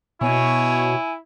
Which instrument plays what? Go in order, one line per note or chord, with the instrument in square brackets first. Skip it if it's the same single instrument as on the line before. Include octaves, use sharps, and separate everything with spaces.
[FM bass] B2 [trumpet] E4 [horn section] C#5 [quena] G#5